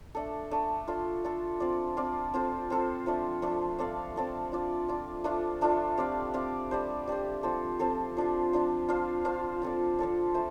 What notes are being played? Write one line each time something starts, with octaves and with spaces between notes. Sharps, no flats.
A3 D4 A4
A3 D4 A4
D4 F4 A4
D4 F4 A4
C4 F4 D5
C4 F4 D5
C4 F4 A4 C5
C4 F4 A4 C5
F3 A3 D4
F3 A3 D4
C4 A4 D5 F5
C4 A4 D5 F5
D4 F4 D5
D4 F4 D5
A3 D4 F4 A4
A3 D4 F4 A4
C4 G4 D5 F5
C4 G4 D5 F5
G3 D4 G4 C5
G3 D4 G4 C5
F3 C4 A4 C5
F3 C4 A4 C5
F3 D4 F4
F3 D4 F4
D4 F4 C5 F5
D4 F4 C5 F5
F3 C4 A4 D5
F3 C4 A4 D5
A3 F4 C5